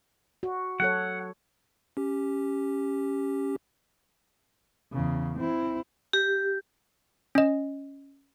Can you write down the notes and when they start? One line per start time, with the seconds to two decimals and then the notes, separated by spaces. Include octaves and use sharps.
0.43 F#4
0.80 F#3 A4 C#5 F#5
1.97 C#4 G4
4.92 E2 C#3
5.39 C4 E4
6.13 G4
7.35 C#4 D#5